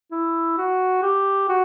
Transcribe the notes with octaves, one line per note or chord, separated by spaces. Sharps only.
E4
F#4
G4
F#4